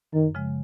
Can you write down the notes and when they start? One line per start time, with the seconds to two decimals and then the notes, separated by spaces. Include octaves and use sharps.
0.13 F#2 D#3
0.35 C#3 F3 G#3